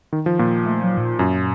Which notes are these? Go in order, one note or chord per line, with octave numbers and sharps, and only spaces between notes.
D#3
F3
A#2
A3
F#3
A2
A#2
F#2 A#2